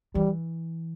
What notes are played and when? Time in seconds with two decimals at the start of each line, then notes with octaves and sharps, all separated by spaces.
0.15 E3 G3